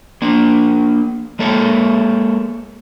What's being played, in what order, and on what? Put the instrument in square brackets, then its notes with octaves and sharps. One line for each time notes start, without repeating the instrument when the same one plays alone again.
[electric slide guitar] A#3 D4
G#3 A#3 A4 C#5